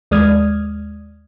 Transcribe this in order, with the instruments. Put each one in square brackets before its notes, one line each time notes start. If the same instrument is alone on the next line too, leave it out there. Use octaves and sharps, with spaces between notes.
[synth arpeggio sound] D#2 G#3 D5 D#6 F6 G#6